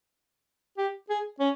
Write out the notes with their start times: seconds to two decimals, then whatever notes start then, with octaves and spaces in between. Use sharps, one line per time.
0.78 G4
1.09 G#4
1.40 C#4